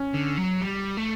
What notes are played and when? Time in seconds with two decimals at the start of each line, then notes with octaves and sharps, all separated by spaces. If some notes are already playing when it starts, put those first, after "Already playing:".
Already playing: C#4
0.14 D3
0.37 F#3
0.61 G3
0.97 A3